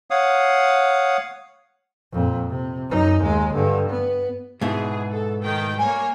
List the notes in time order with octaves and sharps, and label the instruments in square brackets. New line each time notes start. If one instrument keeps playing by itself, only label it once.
[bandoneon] C#5 F5 F#5 D#6
[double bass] F2 A#2
C3
F#2 D#4
D#2 G#3
G2 D3
B3
[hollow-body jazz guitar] G#2 B2 E4 [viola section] G#3 G#4
[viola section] A4
D#3 A3 G5
[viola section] G3 A#3 C#5 [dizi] G#5